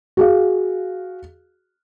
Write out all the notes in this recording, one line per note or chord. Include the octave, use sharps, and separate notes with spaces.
F#4 G#4 F5